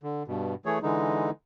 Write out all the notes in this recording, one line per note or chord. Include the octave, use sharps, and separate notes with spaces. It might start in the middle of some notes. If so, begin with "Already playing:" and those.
D3
G2 B2
E3 A3 G#4 C#5
D3 E3 G#3 D#4